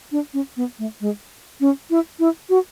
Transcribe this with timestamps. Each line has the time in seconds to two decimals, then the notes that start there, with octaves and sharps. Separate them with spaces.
0.12 D4
0.34 C#4
0.57 B3
0.79 A3
1.01 G#3
1.61 C#4
1.90 E4
2.19 E4
2.50 F#4